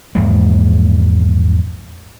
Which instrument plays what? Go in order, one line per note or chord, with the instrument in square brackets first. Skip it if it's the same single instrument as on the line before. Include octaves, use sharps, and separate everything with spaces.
[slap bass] A#1 E2 G#2 A#3